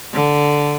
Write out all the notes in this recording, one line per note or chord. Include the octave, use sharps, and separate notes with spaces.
D3